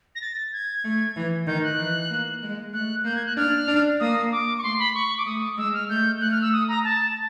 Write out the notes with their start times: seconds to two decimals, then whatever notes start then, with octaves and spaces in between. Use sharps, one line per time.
0.15 A#6
0.22 A6
0.52 G#6
0.84 A3
1.16 E3
1.47 D#3 G6
1.63 F#6
1.79 E3
2.10 A#3
2.43 G#3
2.73 A3 F#6
3.05 A#3 G6
3.15 G#6
3.26 F#6
3.37 D4 F6
3.68 D4
4.00 A#3 D#6
4.32 D6
4.58 C#6
4.63 A3 C6
4.79 B5
4.95 C#6
5.17 D6
5.26 A3 D#6
5.57 G#3 E6
5.73 F6
5.89 A3 G6
6.20 A3 F#6
6.31 F6
6.42 E6
6.53 D#6
6.68 A#5
6.84 A5